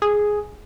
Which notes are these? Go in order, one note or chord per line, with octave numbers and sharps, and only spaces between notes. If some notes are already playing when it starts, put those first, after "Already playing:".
G#4